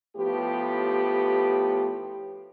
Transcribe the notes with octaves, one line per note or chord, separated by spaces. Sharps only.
A2 F3 B3 G4